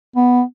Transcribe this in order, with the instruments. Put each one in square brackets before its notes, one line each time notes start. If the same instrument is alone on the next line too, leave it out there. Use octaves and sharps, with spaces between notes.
[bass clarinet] B3